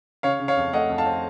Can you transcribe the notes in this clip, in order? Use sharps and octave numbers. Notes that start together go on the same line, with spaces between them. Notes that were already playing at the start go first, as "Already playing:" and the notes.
C#3 C#5 F5
C#3
C#5 F5
F2
A3 D#5 F#5
F2
F5 A5
C4